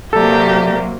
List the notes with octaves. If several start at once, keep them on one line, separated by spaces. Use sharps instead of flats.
C3 F#3 A#3 G4 A4 D5 E5 A#5